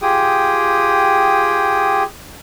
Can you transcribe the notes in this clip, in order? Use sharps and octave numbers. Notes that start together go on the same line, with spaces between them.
F4 G4 G#4 G5 D#6